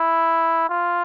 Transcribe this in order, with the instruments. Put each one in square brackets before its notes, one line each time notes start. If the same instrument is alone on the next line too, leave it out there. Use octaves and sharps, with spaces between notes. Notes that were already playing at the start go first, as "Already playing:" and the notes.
Already playing: [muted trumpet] E4
F4